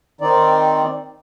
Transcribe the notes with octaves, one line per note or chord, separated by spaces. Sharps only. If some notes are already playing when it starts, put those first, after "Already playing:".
D#3 C4 D#4 D5